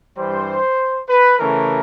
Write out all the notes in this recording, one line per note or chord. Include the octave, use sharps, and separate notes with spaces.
G2 E3 G3 C5
B4
C#3 E3 A3 C#4 A#4